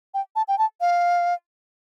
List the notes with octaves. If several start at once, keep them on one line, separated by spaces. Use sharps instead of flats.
G5
A5
G5
A5
F5